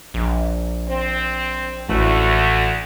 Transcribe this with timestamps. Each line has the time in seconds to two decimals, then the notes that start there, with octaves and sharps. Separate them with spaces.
0.14 A#1
0.88 C4
1.89 A1 D2 A3 F#4